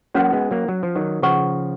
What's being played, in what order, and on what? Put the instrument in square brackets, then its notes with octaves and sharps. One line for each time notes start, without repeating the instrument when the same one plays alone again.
[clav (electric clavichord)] F#3 A#3 [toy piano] C#4 F#4 B4 F#5
[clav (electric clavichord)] G#3 B3
F#3 A#3
F#3
F3
D#3 F#3
[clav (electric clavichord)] C#3 F3 [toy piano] B4 F#5 C#6